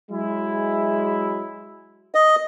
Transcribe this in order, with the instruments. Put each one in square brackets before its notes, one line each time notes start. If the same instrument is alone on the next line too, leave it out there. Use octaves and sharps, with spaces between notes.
[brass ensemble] F#3 G#3 E4
[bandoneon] D#5